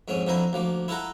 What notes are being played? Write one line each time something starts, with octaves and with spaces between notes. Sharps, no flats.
F2 G#2 C4 C#4
F2 D3 F3 E4 C5 A#5
D2 F3 A#3
E4 F4 A4 F#5 A#5